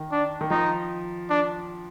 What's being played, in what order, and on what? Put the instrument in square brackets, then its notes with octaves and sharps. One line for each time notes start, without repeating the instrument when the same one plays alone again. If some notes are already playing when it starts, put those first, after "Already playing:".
Already playing: [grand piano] D#3
[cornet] D4
[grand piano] D#3
[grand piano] F3 [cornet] D#4
[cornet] D4